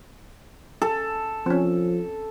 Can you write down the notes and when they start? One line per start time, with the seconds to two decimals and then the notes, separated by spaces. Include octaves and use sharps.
0.82 A4
1.46 F3 C4 C#4